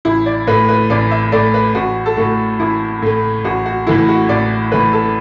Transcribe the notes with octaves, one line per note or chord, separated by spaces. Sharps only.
A1 E4
D5
A2 A3 B4
B4
A1 D5
E5
A2 A3 D5
B4
A1 F#4
A4
A2 A3 F#4
A1 E4
A2 A3
A1 F#4
F#4
A2 E3 A3 E4
F#4
A1 D5
A2 E3 A3 B4
A4